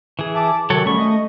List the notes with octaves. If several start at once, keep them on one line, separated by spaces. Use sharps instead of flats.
E3 G#4
E5 A5 D6
C3 D#3 F#3 A4 C#5
G3 A3 B3 C#4 C#6
D#5